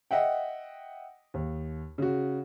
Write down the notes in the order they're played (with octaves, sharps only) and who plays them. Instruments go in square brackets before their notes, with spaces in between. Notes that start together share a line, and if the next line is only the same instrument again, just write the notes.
[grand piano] D#5 E5 F#5 G5
D#2
C#3 F#4